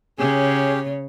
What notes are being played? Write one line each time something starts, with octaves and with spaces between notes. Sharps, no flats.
C#3 C#4 G4 G#4 C#5